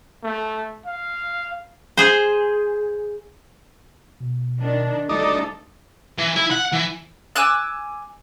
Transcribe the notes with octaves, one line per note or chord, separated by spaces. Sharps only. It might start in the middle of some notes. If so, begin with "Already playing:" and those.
A3
F5
G#4 C5
B2
D#3 D4
G#1 D2 G3 D4 D#4 A4
E3
E4
F#5
E3
G#5 D6 E6 F#6